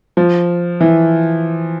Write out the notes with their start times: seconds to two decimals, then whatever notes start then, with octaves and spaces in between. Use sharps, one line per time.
0.17 F3
0.80 E3